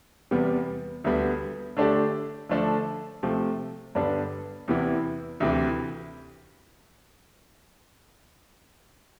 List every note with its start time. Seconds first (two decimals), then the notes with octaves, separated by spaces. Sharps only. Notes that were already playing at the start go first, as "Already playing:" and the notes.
0.31 E2 C3 G3 B3
1.04 D2 D3 G3 B3
1.77 D3 A3 D4 G4
2.49 D3 F3 A3 D4 A4
3.23 C3 F3 A3
3.95 G2 D3 G3 B3 D4
4.68 E2 C3 E3 B3 E4
5.40 D2 C3 E3